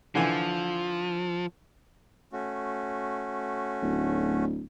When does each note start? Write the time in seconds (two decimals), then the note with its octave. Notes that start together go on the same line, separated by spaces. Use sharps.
0.15 D3 E3 F3 G#5
2.33 A3 C#4 F#4
3.82 D1